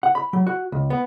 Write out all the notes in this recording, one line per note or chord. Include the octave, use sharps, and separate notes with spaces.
F#5
B5
F#3
F#4
C#2
B3